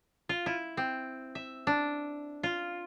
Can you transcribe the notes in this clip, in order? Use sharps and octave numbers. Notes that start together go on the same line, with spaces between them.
F4
E4
C4
E5
D4
F4